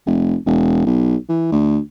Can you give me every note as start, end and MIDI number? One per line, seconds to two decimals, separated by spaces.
0.06 0.36 29
0.46 0.86 28
0.86 1.16 35
1.29 1.48 52
1.52 1.79 38